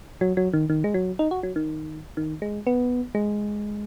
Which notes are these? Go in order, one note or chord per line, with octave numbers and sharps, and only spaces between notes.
F#3
F#3
D#3
D#3
G#3
F#3
D#4
F#4
F#3
D#3
D#3
G#3
B3
G#3